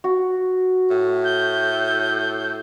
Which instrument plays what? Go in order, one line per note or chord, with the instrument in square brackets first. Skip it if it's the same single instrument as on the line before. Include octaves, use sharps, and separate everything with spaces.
[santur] F#4
[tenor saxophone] A2
[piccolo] G6